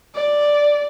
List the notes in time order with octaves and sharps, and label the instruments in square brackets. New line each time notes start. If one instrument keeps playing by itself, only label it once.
[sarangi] D5